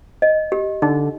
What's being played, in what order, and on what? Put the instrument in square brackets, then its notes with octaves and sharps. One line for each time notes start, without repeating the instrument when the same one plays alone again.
[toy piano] D#5
G4
[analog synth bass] D3 [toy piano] D#4